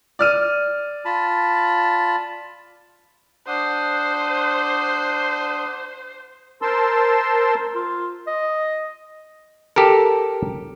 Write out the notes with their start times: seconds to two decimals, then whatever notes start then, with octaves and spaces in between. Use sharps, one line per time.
0.19 D5 F6 D#7
1.05 F4 A5 B5
3.47 D4 C5 F#5 D#6
6.62 A#4 C5 A5 C6 E6
7.75 F4
8.27 D#5
9.76 G4 A4 A#4